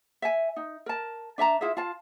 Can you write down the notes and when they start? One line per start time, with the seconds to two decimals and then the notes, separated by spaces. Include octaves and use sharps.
0.22 E5 G#5
0.56 D#4
0.86 A#4 A5
1.38 D4 E5 A5 A#5
1.61 E4 F4 G#4 E5
1.77 F4 F5 A5